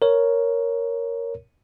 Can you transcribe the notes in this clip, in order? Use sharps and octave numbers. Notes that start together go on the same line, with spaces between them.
A#4 C#5